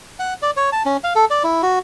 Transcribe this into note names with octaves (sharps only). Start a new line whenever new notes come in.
F#5
D5
C#5
A5
C#4
F5
A4
D5
E4
F#4